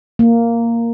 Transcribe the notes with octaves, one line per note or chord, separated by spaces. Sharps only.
A#3